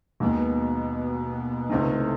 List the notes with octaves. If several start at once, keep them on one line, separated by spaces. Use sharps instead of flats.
D#2 B2 D#3 G#3 B3
C#2 A2 C3 D#3 A3